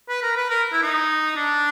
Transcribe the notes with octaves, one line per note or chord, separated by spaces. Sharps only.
B4
A#4
B4
A#4
E4
D#4
D4